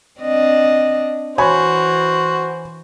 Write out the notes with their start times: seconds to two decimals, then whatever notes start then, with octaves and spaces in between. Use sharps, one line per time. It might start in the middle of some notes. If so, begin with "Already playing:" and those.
0.20 C4 D4 D#5
1.38 E3 F#4 C5 C#5 G#5 B5